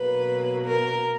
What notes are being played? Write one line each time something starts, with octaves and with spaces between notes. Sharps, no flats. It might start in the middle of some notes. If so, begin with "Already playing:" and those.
Already playing: B2 F#3 A#3 B4
A#4